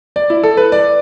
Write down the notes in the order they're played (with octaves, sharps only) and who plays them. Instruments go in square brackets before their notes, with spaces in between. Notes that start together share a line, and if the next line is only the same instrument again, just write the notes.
[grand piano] D5
E4
A4
B4
D5